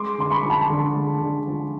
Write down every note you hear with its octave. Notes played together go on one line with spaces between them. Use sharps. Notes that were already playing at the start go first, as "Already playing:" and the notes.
Already playing: G#3 C6 D6
D3 C6
B5 C#6
F3
A5 B5
D3
G#3
D3
F3